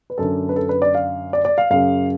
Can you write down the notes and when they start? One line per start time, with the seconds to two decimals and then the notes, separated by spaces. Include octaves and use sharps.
0.10 B4
0.18 F#2 D3 A4
0.49 B4
0.56 A4
0.69 B4
0.82 D5
0.95 F5
1.33 D5
1.45 D5
1.58 F5
1.70 F#2 C#3 F5